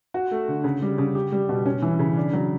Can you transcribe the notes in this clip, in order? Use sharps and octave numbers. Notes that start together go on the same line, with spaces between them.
F#4
A3
D3
C#3
G3
C#3
G4
G3
B2
C#4
E3
C#3
D4
F#3